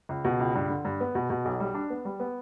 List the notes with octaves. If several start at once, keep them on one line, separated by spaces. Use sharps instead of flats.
C#2
B2
C#2
G2
D3
G2
B3
B2
B2
B1
G3
D4
B3
G3
B3